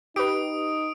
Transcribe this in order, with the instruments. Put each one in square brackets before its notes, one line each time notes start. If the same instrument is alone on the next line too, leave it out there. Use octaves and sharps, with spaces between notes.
[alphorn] D#4 [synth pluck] G4 B4 [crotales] D#6 D7